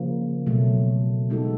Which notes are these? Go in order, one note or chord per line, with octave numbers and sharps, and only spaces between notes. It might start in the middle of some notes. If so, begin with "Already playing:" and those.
Already playing: C#3 F3 A#3
B2 F#3 A3
G#3 B3 D#4 F#4 A4